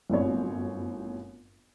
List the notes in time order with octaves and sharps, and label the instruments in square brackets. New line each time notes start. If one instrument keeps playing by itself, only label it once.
[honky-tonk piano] G1 F#2 A2 C4 C#5